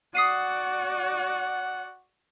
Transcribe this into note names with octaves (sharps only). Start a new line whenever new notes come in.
F#4 D5 F#5 D#6 C7 D#7